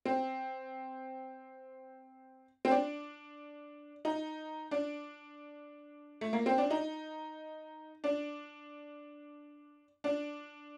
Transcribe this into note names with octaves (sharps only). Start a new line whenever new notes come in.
C4
C4
D4
D#4
D4
A3
A#3
C4
D4
D#4
D4
D4